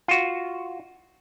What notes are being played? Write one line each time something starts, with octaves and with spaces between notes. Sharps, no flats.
F4 F#4